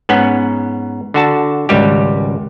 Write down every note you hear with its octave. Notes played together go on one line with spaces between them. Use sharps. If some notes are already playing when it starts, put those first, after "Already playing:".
G#2 B3 C#4 F#5
D3 F#4 A5
G#1 C#2 G3 G4